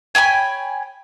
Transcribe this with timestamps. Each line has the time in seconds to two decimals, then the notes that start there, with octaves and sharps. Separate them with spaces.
0.15 C#5 G5 G#5 B5